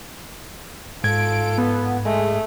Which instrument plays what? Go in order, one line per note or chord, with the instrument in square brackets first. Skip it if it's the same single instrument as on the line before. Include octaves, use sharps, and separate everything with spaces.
[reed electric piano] G#2 G#6 [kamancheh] F4 A4 [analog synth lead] D7
[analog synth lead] B3
[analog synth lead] G#3 [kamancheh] A3